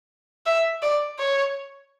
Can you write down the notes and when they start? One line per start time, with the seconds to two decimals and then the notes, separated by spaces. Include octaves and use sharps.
0.46 E5
0.83 D5
1.19 C#5